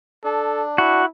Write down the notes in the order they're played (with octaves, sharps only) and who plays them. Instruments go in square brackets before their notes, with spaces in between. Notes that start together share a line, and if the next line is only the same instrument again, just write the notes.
[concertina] D4 [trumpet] A4
[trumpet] E4 [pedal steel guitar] F#4